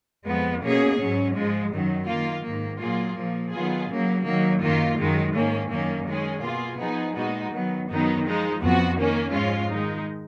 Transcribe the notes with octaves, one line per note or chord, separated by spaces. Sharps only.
F2 F3 G#3 B3
B2 A#3 C#4 G#4
G#2 F#3 C#4
G#2 F3 G#3
F#2 D#3 F#3
D#3 A#3 F4
G#2 D#3 A#3
A#2 F#3 A#3 F4 G#4
A#2 F3 A#3
D#3 F#3 B3 F4 G#4
C#3 F#3 A#3
D#3 F#3 A#3
F#2 D#3 A#3 F4
F#2 D#3 G#3
G#2 D#3 A#3 C#4
F#2 D#3 A#3 C#4
D#3 G#3 C#4 G#4
B2 A#3 F4 G#4
F3 B3 D#4 G#4
A#2 G#3 B3 D#4 F#4
D#3 F#3 B3
F#2 D#3 F#3 B3 D#4
F3 G#3 D#4
F2 F3 B3 F#4
D#3 A#3 C#4
G#2 F3 G#3 C#4 F4
D#3 G#3 D#4